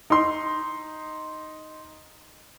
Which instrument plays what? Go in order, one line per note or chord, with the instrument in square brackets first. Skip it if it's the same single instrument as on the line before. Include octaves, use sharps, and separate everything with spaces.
[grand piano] D#4 C6